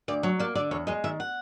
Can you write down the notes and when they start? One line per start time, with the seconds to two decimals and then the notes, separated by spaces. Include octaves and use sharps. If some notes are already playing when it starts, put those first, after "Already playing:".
0.08 D2 D5
0.23 F#3 C#5
0.39 A#3 D5
0.55 D3 D5
0.71 E2 C#5
0.87 G#3 D#5
1.04 D#3 E5
1.20 F#5